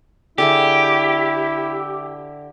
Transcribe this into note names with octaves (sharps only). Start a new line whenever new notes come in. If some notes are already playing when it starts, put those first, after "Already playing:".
D3 E4 G4 G#4 E5